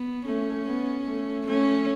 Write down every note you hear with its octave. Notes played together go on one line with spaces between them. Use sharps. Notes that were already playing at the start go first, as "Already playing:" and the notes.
Already playing: B3
A3 C#4
B3
A3
A3 C#4